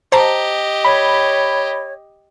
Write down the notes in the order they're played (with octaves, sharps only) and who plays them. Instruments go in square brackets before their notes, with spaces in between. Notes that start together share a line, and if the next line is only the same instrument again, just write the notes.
[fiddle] G4 D#5 [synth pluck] C5 A5 A#5
[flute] C#5 [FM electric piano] B5